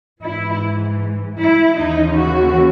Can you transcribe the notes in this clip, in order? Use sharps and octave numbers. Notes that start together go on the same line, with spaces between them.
G#2 E3 E4
E4
D#2 C#3 E3 D#4
F#4